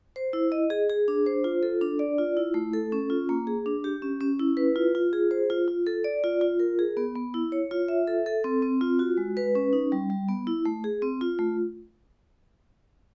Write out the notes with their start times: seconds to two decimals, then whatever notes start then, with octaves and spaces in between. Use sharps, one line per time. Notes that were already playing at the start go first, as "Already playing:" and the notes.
0.16 C5
0.33 E4
0.52 D#5
0.70 G#4
0.90 G#4
1.08 D4
1.26 C5
1.44 F4
1.63 A4
1.81 D4
1.99 D5
2.18 F4
2.37 E4
2.54 A3
2.74 A4
2.92 C#4
3.10 F4
3.29 A#3
3.47 G#4
3.66 D4
3.84 G4
4.02 C#4
4.20 C#4
4.39 E4
4.57 B4
4.76 F4
4.95 F4
5.13 G#4
5.31 C5
5.50 F4
5.68 F4
5.87 A4
6.04 D5
6.24 F4
6.41 F4
6.60 A#4
6.79 G#4
6.97 B3
7.16 B3
7.34 E4
7.52 C#5
7.71 F4
7.88 E5
8.07 A4
8.26 A4
8.44 C4
8.62 C4
8.81 F4
8.99 F#4
9.17 G#3
9.37 B4
9.55 C#4
9.73 D#4
9.92 G3
10.10 G3
10.29 B3
10.47 E4
10.65 A3
10.84 G#4
11.02 C4
11.21 F4
11.39 A3